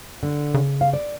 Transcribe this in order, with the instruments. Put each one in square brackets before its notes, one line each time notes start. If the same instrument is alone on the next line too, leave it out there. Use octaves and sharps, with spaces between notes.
[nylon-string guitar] D3
[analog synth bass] C#3
[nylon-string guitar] F5
D5